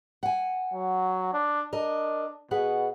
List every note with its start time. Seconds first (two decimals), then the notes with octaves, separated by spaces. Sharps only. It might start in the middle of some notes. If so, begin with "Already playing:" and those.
0.23 F#5 G#5
0.73 F#3
1.33 D4
1.73 D4 A#4 D#5
2.51 B2 G#4 B4 F#5